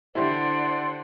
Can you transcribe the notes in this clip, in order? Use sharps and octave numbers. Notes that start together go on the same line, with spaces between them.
D3 E4 G4 C5 D5 F#5